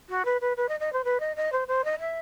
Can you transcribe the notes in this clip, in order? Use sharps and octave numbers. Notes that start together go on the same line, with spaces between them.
F#4
B4
B4
B4
D#5
D#5
C5
B4
D#5
D#5
C5
C5
D#5
E5